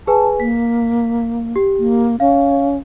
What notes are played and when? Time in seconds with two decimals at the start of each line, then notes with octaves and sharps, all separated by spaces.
0.07 G#4 B4 G#5 A5
0.40 A#3 B6
1.56 G4
1.79 A#3
2.20 C#4 F5